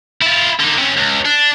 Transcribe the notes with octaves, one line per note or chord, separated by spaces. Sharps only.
E4 F4
D3 D#4
C3 C#4
C#2
D4